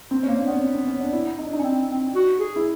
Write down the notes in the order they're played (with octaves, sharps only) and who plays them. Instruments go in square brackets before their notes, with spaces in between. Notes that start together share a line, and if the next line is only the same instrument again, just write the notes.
[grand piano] C4
[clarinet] A#3 [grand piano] C#4
[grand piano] D4
[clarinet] B3 [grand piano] C#4
[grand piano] C4
C4
C#4
D4
E4
D#4
D4
D#4
[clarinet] C#4
C4
C4
F#4
G#4
[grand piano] E4